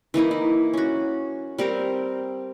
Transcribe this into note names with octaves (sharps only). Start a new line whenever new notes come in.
E3 A#3 D#4 E4
E4
C#4 F#4
G3 C4 G4 A#4